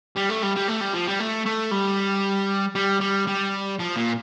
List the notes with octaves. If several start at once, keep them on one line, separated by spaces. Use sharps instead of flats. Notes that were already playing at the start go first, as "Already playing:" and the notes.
G3
A3
G3
G3
A3
G3
F3
G3
A3
A3
G3
G3
G3
G3
F3
A#2